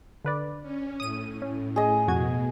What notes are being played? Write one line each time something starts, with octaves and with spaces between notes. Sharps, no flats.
D3 B4 D5
C#4
A2 D#6 D#7
C#4
G#4 D#5
F2 B2 F#4 G#6